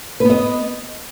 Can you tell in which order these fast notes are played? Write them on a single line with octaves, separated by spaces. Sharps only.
B4 B3 D#5